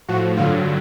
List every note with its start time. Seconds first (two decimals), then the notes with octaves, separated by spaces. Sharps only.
0.09 A2 F3 F#4
0.37 G2 D3 F#3 F4